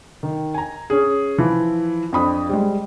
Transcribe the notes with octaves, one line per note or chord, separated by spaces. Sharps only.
D#3
G#5 A#5
C#4 G#4
E3 F3 E4
F2 D4 B5 D#6
G3 G#3